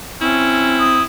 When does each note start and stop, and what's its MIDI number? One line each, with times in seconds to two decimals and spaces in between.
0.21 1.02 60
0.21 0.82 61
0.21 1.03 64
0.79 1.03 87